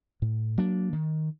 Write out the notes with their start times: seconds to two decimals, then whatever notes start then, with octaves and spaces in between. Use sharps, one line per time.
0.22 A2
0.58 F#3 A#3 D4
0.93 D#3